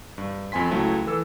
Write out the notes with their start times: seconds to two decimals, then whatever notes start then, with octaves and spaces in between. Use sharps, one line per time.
0.18 G2
0.52 F2 C4 G#5 C6 B6
0.71 C#2 F#3 A3 E4 A5
1.06 E3 A4 E6